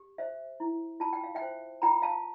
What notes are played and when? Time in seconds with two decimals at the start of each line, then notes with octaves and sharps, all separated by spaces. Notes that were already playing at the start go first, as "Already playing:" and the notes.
Already playing: G4
0.18 C5 E5
0.60 E4
1.00 F4 A5
1.13 G5
1.24 F5
1.35 E5 G5
1.42 C5
1.82 F4 G5 A#5
2.02 F5 A5